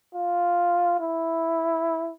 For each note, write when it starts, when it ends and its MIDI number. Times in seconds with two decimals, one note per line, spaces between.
0.14 0.96 65
1.00 2.12 64